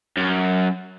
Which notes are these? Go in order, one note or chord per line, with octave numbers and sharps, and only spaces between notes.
F#2